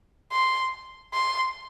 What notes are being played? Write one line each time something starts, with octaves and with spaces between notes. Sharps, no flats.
C6
C6